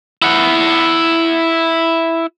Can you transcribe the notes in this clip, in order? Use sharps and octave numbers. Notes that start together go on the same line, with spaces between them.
E4 F#5